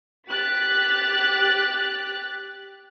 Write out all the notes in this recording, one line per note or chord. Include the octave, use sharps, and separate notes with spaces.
G4 F#6 A6 B6